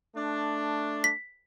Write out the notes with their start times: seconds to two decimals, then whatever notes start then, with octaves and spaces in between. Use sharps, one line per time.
0.16 A3 D4
1.04 B6